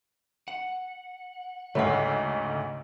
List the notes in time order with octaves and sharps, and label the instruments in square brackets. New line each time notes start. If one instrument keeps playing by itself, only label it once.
[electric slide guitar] F#5
[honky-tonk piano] D2 G#2 A3 [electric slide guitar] C#3 [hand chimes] C#5 F#5